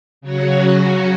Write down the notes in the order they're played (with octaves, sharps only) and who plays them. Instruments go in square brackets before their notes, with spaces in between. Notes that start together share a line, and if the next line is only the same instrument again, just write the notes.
[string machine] C#3 F#3 C#4 F#4